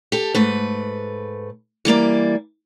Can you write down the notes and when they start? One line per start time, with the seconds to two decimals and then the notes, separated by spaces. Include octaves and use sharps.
0.12 G4 A4
0.34 G#2 A3 B4
1.85 E3 G3 A#3 D5